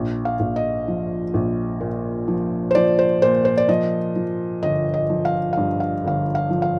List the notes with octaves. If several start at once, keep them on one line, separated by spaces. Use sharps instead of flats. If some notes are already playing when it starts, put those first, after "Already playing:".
Already playing: A#1
F5
A#1
D#5
F3
A#1
A#2
F3
C5
F3 D5
C5
A#2 C5
C5
D5
F3 D#5
F3
G1 D#5
D#5
F3
F5
G2 F5
F5
G1 F5
F5
F3
F5